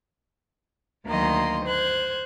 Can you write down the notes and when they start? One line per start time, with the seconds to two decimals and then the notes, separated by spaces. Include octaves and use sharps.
1.08 D2 D#3 F#3 A#3 D#5 C6
1.66 C5 F#6 G#6